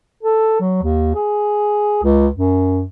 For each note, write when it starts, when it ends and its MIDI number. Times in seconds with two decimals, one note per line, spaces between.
0.23 0.60 69
0.60 0.82 54
0.83 1.10 39
1.15 2.03 68
2.03 2.27 37
2.36 2.84 42